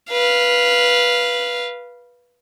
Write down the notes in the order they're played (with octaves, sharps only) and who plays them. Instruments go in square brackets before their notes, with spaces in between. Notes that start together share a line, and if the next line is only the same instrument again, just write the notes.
[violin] B4 F5